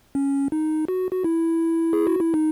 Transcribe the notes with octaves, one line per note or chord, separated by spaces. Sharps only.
C#4
D#4
F#4
F#4
E4
G#4
F#4
E4
D#4